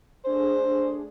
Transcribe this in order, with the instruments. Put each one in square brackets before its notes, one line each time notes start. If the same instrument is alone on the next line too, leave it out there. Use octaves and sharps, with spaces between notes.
[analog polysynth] A3 D4 G#4 [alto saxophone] C5